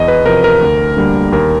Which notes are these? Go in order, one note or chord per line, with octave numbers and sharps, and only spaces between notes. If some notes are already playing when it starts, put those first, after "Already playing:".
Already playing: E2 D#5
B4
C3 F3 A#4
A#4
D2
D3 G3 A#3
D#2 A#4